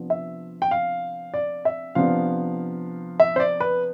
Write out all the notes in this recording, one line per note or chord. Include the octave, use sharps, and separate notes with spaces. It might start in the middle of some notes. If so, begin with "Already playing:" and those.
Already playing: C3 F3 B3 D4
E5
G5
F5
D5
E5
C3 F3 B3 D4 F5
E5
C5
D5
B4